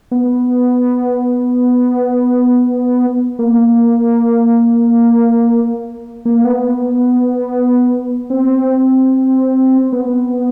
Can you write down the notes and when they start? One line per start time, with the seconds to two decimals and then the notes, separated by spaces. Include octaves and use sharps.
0.11 B3
3.39 A#3
6.25 A#3
6.45 B3
8.30 C4
9.93 B3